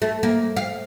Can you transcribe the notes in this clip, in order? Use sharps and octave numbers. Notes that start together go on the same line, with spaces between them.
A3
A#3
F5